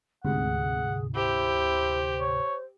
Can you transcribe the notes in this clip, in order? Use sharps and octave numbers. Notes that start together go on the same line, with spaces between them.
D2 G#2 C3 G#4 F#5
E4 G4 C5
C#5